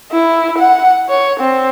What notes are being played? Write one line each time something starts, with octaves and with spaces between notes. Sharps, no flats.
E4
F#5
C#5
C4